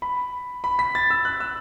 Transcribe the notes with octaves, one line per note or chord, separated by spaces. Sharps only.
B5
B5
B6
A6
E6
F#6
E6